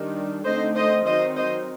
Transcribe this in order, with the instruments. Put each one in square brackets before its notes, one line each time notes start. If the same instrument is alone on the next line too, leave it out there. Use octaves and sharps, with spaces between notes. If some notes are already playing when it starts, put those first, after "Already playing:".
Already playing: [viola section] D#3 G3 D4
D3 A3 C4 D#4 C5 D#5
C5 D#5
D#3 F#3 C4 D#4 C5 D#5
C5 D#5